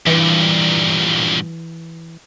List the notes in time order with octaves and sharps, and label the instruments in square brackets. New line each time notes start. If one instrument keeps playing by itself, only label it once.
[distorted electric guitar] G2 A#2 [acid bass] E3